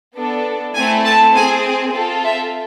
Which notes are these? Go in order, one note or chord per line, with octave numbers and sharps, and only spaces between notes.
B3 D4 A4
A3 C4 E4 G#5
A5
C4 G#4 G#5
C4 F4 A4
E5